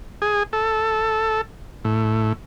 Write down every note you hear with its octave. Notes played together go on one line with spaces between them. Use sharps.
G#4
A4
A2